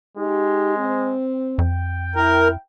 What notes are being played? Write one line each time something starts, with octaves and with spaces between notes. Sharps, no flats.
G#3 D#4 G4
C4
F2 G5
E4 A#4